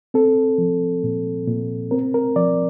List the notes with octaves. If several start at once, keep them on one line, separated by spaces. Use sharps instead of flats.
C4 A4
F3
A#2
A#2
C4 A#4
A#4
F3 D5